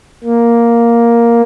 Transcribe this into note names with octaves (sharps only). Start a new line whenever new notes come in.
A#3